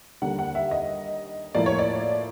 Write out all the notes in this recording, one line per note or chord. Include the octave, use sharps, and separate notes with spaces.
D#2 D3 G3 A#3 F#5
F#5
E5
D#5
A2 F3 A#3 D5
C#5
D5